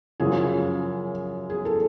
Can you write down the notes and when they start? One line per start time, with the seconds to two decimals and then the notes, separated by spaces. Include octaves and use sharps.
0.20 F#2 C#3 F3 G#4
1.50 G#4
1.65 A4